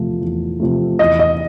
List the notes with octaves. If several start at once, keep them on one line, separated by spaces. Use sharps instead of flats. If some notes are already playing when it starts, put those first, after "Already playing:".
Already playing: E2 C3 F3 A3
E2
C3 F3 A3
E2 D#5
D#5